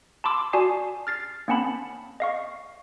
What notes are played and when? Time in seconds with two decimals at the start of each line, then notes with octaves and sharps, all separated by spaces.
0.24 A5 B5 C6 D6 E6
0.53 F#4 D5 G#5 A5 D#6 C7
1.07 F6 A6 C7
1.48 A#3 C4 C#4 F#5 A5 B5
2.20 D#5 F5 C#6